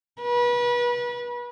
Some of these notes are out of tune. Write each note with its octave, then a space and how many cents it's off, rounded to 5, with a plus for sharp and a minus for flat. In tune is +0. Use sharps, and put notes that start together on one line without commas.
B4 -30